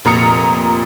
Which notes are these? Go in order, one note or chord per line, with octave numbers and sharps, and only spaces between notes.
F1 A#2 F3 A#5 D#6 C#7